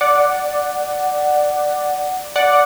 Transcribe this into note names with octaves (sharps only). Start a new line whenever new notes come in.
D5 F#5
D5 F#5